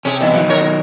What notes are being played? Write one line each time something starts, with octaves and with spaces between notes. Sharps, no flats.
C3 C#4 G#4 G5
E2 G2 B2 E4
D#3 F#3
F#2 A#4 C#5
A#4